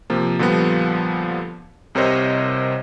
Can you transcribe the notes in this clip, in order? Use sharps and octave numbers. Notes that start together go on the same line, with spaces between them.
C3 F3 A#3
A#2 D3 F3 G3 B3
C2 C3 A#4 C5 C#5 D#5